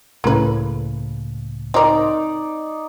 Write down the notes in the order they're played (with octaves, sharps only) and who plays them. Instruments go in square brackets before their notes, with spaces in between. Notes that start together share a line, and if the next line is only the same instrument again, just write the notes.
[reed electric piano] C#2 A2 C#3 [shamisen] A#3 B4
[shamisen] C4 A#4 [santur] D#4 D5